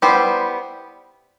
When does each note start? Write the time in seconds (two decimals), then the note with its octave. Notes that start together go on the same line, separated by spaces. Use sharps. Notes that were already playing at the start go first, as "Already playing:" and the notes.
0.02 G3 B3 E4 G4 C5